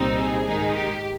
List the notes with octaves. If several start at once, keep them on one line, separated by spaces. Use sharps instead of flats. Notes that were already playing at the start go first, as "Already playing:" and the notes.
Already playing: C2 A#2 G3 C4 D#4
G#4
G#2 D#3 G#3 D#4
G4